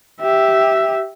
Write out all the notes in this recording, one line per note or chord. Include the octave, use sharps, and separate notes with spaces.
G4 E5